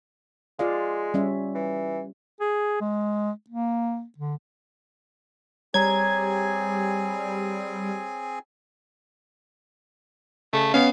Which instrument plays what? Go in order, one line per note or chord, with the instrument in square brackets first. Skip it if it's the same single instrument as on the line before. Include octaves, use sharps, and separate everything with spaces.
[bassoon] G#3 [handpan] F4 D5 F5
[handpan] G3 C#4 E5
[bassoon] E3
[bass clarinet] G#4
G#3
A#3
D3
[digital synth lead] G3 [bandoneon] C4 G#4 G#5 [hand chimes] C#5 A#5 [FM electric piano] G#6
[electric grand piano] C#3 [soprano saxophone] A3
[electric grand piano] B3 C#4 [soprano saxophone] F5